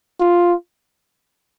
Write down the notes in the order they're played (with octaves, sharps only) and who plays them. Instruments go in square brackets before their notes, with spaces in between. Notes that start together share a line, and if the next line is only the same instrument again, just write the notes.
[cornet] F4